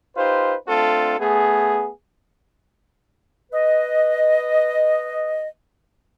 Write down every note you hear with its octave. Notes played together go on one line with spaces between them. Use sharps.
D#4 F4 G4 B4 C5
A3 C4 D4 F4 A4
A3 B3 G#4
B4 D#5